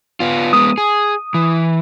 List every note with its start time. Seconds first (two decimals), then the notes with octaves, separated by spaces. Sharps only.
0.20 B3 F4
0.53 G#3 B3 D#6
0.78 G#4
1.34 E3